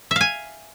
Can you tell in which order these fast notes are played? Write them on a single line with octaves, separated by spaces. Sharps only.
E5 F5 G#5